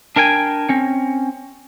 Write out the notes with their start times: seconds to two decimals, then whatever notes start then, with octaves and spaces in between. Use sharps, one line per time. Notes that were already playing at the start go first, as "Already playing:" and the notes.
0.16 D4 A#4 G5 G#5
0.69 C4 C#4